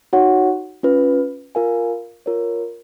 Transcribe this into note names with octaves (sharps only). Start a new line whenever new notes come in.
D#4 F#4 C#5 F#5
C#4 F4 B4
F4 A#4 F5 G#5
F4 A#4 C#5